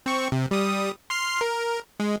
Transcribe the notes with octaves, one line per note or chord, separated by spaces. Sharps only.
C4 C#6
C3
G3 D#6
C6 F6 C7
A#4
G#3